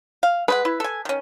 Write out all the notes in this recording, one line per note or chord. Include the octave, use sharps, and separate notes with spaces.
F5
G#3 B4 C5 F#5
E4
A4 G#5
D#3 C#4